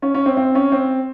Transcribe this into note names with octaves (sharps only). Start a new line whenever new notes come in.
C#4
C#4
C4
C4
C#4
C4